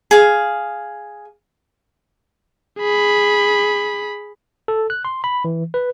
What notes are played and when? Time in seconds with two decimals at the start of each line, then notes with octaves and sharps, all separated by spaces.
0.11 G#4 F5
2.79 G#4 B5
4.68 A4
4.90 F#6
5.05 C6
5.24 B5
5.45 E3
5.74 B4